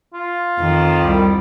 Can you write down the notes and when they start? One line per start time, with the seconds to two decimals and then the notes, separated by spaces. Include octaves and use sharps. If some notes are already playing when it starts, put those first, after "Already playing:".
0.14 F4
0.59 F2 D#3
1.03 C2 G3